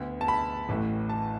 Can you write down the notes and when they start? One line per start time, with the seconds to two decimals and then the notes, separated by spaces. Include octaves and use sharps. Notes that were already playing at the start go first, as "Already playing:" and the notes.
Already playing: D2 D3 B3
0.21 A5
0.28 B5
0.69 A1 A2 E3 A3
1.09 A5